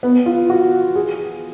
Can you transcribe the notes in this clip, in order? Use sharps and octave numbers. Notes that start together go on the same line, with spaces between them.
B3
F4
F#4
G#4